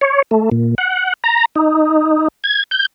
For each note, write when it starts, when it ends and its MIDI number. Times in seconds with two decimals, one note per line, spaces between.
0.01 0.22 73
0.31 0.49 57
0.51 0.75 46
0.78 1.13 78
1.24 1.45 82
1.56 2.28 63
2.44 2.63 92
2.71 2.86 91